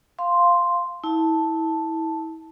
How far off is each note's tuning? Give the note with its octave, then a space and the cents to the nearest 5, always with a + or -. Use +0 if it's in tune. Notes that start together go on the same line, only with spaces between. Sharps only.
F5 +0 C6 +0
E4 -30 A5 +0